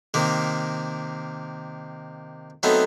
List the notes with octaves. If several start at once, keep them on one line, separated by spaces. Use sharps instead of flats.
C3 D#3 A#3
F#3 A3 B3 C4 D#4